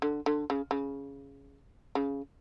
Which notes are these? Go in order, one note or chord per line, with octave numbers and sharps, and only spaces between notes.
D3
D3
C#3
C#3
C#3